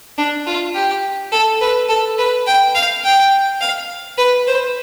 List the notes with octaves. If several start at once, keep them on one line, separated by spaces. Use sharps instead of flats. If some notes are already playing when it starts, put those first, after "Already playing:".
D4
F4
G4
A4
B4
A4
B4
G5
F5
G5
F5
B4
C5